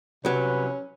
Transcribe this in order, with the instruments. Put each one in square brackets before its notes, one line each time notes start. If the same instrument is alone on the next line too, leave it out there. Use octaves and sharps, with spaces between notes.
[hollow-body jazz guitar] C2 F#3 [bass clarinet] C3 [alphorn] C#4 [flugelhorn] B4